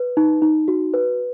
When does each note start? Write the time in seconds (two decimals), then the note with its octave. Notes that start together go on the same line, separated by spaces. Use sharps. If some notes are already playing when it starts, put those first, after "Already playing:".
Already playing: B4
0.17 D#4
0.42 D#4
0.68 F#4
0.94 B4